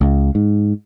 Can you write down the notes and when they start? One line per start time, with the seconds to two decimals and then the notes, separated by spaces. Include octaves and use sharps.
0.01 C#2
0.35 G#2